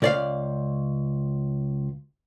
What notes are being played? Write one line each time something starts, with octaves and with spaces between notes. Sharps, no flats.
C#2 D5 F5